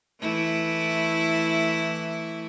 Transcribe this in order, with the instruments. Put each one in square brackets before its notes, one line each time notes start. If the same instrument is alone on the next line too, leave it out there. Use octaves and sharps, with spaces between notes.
[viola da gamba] E3 A3 E4